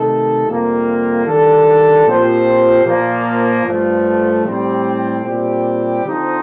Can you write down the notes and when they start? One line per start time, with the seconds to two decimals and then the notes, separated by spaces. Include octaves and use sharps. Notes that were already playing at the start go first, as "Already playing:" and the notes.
Already playing: C3 D#3 A3 D#4 A4
0.47 F2 C3 G3 A#3
1.26 D#3 G3 D4 A4
2.07 A#2 F3 C4 G4 C5
2.85 A#2 F3 A#3
3.66 G2 F3 A3
4.45 A2 G3 C4
5.25 A#2 G3 C4 G4
6.05 D3 F3 C4 D#4